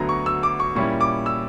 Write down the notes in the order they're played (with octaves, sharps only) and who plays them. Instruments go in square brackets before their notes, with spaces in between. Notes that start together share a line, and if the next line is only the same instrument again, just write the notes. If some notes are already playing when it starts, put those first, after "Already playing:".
Already playing: [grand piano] D2 D3 F#3 B3 A#5
C#6
E6
D6
C#6
A#2 G3 C#4 E4 C#6
D6
E6